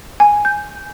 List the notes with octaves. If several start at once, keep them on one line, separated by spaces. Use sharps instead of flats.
G#5
G6